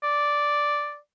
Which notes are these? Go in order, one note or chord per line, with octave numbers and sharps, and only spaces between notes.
D5